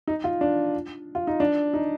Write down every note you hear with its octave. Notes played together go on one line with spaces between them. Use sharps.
D#4
F4
D4
F4
D#4
D4
D#4